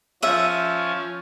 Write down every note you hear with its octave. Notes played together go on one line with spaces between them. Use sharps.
F3 C#4 E5 D#6